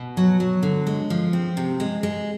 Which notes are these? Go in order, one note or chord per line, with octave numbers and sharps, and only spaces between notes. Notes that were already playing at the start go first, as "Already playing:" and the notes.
Already playing: B2
F#3
F#3
D3
G#3
F3
C4
C3
G#3
G#3